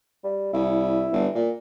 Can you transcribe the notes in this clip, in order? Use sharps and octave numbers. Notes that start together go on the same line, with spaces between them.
G3
C2 E4
G1
A#2